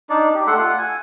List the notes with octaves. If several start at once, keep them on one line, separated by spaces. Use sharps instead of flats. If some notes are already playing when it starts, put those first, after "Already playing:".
D4 D#4 D5
G4
A3 A4 F#5 C6
F4 F#5
G#5